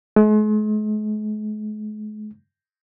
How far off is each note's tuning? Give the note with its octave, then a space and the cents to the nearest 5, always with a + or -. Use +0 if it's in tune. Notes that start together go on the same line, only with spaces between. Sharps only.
G#3 +45